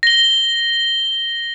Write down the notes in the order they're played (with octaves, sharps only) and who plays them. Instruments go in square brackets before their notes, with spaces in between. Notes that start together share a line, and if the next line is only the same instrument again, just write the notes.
[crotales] A#6 G7